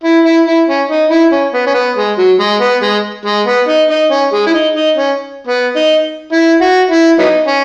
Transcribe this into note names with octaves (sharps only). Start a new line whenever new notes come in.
E4
E4
E4
C#4
D#4
E4
C#4
B3
C#4
B3
G#3
F#3
G#3
B3
G#3
G#3
B3
D#4
D#4
C#4
G#3
E4
D#4
D#4
C#4
B3
D#4
E4
F#4
E4
F#3 B3 D#4
C#4